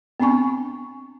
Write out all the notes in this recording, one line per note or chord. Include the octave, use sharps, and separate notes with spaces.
B3 C4 D4 G#5 C#6